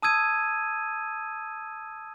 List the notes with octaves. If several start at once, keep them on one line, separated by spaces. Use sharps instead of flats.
A5 D#6 E6 G#6 D#7